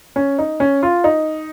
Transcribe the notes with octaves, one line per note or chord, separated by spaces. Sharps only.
C#4
D#4
C#4
F4
D#4